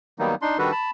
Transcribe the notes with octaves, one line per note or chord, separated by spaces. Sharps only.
D#3 F#3 G3 A#3 B3 D#4
D4 D#4 C6
D#3 G3 D4 F#4 A4 B4
A5 B5